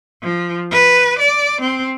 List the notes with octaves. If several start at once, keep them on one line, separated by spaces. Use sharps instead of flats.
F3
B4
D5
C4